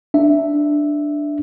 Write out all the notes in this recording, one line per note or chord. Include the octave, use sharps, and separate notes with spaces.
D4 E5